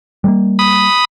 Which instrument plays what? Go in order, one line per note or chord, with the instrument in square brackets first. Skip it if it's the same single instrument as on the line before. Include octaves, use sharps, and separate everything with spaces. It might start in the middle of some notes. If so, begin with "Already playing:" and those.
[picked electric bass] G3 G#3 A#3
[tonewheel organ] B5 D#6